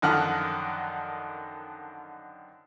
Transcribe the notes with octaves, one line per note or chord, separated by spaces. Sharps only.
F#2 D3 D#3 F3 F#5 F6